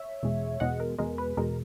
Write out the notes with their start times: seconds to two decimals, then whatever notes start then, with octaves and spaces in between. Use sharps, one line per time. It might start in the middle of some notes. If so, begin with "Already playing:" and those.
Already playing: C#5 E5
0.23 E2 B2 G#3
0.60 E2 B2 G#3 D#5 F#5
0.80 A#4
0.98 E2 B2 G#3 A#4
1.18 B4
1.37 E2 B2 G#3 A#4